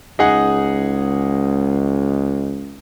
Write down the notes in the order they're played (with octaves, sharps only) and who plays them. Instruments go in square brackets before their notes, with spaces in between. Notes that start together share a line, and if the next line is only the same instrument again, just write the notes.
[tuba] C#2 [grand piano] D#4 G#4 F#5